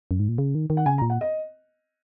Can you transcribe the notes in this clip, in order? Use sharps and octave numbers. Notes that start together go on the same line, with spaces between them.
F#2
G#2
A#2
C#3
D#3
D#3
F#5
C#3 G#5
A#5
A#2
F#5
D#5